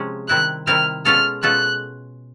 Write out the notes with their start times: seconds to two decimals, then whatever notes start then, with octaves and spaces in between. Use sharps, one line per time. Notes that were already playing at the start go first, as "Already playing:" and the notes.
Already playing: C3 F3 G#3 C#4
0.28 C3 D#3 G3 C4 E4 F#6
0.67 C3 D#3 G3 C4 E4 F6
1.05 B2 G#3 C#4 F4 A4 F6
1.43 B2 G#3 C#4 F4 A4 F#6